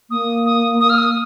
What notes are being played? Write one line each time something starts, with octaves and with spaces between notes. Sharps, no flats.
A#3 D#6
D#6
D#6
F6
D#6